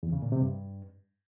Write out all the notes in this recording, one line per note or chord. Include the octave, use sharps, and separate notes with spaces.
E2
C#3
A#2
C3
G2